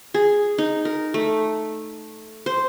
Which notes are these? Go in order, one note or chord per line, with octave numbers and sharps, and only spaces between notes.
G#4
D#4
A#4
A3
C5